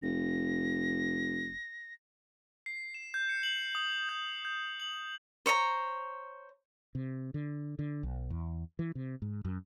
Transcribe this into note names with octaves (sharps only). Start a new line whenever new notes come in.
F1 A#6
C7
E7
G6
C#7
F#7
D#6
G6
G6
F#7
C5 C#5 D#5 A#5
C3
D3
D3
B1
E2
E3
C3
G#2
F#2